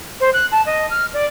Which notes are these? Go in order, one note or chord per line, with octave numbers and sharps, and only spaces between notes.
C5
F#6
A5
D#5
F6
D5